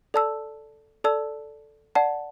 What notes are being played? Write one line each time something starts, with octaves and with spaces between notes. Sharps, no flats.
A4 D5 A5 E6
A4 D5 A5 E6
D5 F#5 A5